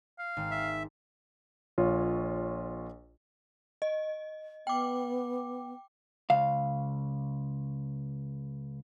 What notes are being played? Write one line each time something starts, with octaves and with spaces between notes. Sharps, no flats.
F5
G#1
E5
A#1 F4 C#5
D#5
B3 G5 D6
C#2 F5